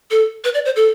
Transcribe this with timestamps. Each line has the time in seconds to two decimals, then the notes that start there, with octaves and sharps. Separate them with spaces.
0.11 A4
0.44 B4
0.54 D5
0.65 C5
0.76 A4